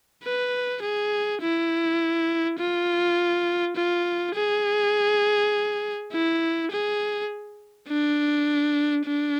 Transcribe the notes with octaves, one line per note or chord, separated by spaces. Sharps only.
B4
G#4
E4
F4
F4
G#4
E4
G#4
D4
D4